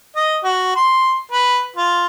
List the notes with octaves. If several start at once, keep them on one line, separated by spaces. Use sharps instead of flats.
D#5
F#4
C6
B4
F4